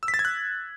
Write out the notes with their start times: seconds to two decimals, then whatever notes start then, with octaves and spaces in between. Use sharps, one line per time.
0.03 E6
0.08 B6
0.14 A6
0.19 G#6
0.25 F#6